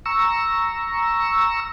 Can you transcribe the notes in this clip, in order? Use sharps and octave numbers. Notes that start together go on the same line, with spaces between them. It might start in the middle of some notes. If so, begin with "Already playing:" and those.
A#5 C#6 E6